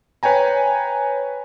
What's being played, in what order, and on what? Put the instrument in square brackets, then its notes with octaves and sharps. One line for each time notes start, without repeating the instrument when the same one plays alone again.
[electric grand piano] B4 C#5 G5 G#5 A#5